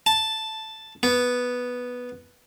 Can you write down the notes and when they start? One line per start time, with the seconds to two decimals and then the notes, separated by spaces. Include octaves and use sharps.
0.06 A5
1.03 B3